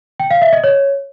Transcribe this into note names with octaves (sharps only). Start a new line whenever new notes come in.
G5
F5
E5
D#5
C#5